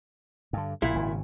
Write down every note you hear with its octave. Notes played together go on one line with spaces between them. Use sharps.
G2 D3
A#1 A#2 E4
G#1 C#3